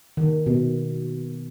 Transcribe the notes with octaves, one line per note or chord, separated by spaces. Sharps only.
D#3
B2